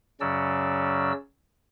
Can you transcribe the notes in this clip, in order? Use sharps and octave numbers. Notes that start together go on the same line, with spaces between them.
F#2 C#3 F#3 C#4 D5 E6